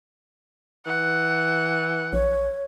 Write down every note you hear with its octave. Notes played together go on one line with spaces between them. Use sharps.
E3 F#5
A#1 C#5